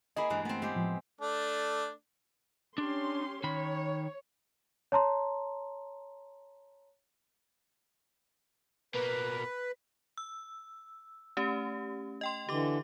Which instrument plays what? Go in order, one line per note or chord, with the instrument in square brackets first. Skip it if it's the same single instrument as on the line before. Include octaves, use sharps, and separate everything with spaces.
[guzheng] A#3 E4 G#4 [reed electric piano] D#5 B5
[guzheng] G2 E3 G#3
[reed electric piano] A3 [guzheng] B3 C4
[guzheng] G#3 G4
[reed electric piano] A2 F3
[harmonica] A3 D4
[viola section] C#4 G4 C6 [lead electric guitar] D4
[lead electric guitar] D#3 B5 [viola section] C#5
[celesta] C#5 A5 A#5 C6
[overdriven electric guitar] B2 A#3 [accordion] B4
[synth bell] E6
A3 C#4 G4
D#5 G5 C6
[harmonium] D3 E3 [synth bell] G4 D6